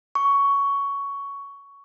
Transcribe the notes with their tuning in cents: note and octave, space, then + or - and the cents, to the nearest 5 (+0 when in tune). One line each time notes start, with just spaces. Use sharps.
C#6 +10